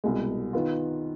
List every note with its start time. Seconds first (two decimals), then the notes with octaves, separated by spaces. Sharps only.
0.04 C2 B2 G#3
0.53 D#3 B3 F4